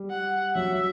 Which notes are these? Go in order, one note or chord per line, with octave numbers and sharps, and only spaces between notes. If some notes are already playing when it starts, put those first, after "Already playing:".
Already playing: G3
F#5
F#3 E5